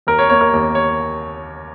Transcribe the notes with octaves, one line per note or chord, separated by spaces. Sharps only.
D#2 A#4
C#5
A#3 C#5
A#4
D#2
C#5